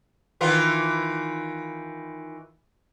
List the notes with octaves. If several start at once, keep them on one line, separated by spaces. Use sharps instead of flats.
D#3 E3 F4